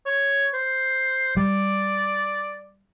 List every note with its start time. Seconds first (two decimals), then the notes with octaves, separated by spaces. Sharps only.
0.06 C#5
0.54 C5
1.37 G3 D5